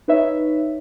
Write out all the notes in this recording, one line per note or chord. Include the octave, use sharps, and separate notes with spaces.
D#4 B4 C#5 E5